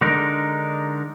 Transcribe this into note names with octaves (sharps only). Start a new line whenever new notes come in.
D3 G#3 D4 D#4 A#4